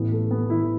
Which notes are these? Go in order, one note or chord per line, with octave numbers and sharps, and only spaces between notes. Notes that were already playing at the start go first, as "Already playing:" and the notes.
Already playing: A1 A2 E3 B3
A3
B3
E3 E4